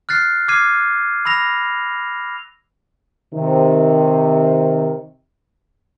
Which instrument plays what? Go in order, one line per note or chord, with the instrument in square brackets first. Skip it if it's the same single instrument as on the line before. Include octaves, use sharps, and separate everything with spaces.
[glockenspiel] F6 F#6 A6 C7
D6 F6 G#6 C7 D#7
B5 E6 A#6 F7
[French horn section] C3 D#3